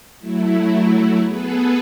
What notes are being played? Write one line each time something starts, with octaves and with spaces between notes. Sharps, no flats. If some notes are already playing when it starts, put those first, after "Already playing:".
F#3 A3 E4
B3 G#4 A4 B4